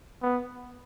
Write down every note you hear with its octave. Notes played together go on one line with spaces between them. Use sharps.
B3